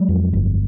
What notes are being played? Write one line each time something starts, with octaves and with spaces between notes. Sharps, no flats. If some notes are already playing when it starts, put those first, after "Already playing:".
Already playing: F#3 G#3
F2
G1